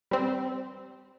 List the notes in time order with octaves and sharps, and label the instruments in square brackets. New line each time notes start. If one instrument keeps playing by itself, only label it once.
[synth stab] G3 C4